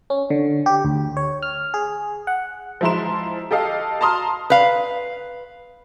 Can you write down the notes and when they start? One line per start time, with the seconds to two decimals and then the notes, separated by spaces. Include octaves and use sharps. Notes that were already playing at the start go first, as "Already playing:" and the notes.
0.10 C#4
0.30 D3
0.66 G4
0.85 D2
1.17 C#5
1.42 F6
1.74 G#4
2.27 F#5
2.81 F3 G#3 E4 A#5 C6 E7
3.51 G4 A4 D#5 F5
4.01 A5 A#5 C6 D#6 F6
4.50 B4 F5